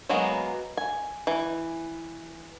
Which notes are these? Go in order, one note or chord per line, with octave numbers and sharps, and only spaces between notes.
F#3 G#3 A#3 B3 F#4
G#5
E3